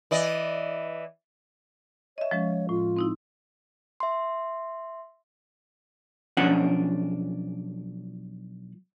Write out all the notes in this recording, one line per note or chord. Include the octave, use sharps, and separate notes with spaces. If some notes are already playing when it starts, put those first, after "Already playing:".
E3 D5 D#5
C#5 D#5 E5
F3 G#3 C#4
A2 F4
C4 D#4 E4
E5 C6
B1 F3 C#4 D4 F#5